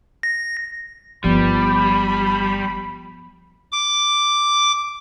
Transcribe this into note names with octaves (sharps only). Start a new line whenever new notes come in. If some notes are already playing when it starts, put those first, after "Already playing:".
A#6
G1 F3 G3 B3 B5
D6